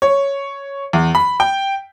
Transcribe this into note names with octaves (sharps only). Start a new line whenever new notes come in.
C#5
E2
B5
G5